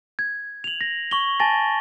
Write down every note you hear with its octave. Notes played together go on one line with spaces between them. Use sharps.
G#6
F7 F#7
A#6
C#6 F#7 G7
G#5 A5 A6 A#6